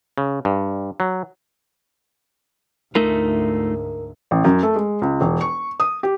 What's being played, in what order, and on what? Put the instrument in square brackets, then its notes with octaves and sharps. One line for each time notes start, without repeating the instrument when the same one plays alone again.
[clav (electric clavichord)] C#3
G2
F#3
[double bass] D2 G#2 [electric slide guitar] A3 D#4 F4 [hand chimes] A#4
[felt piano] A1
F#2
A3
G#3
C#2
E1
C#6
D#6
G4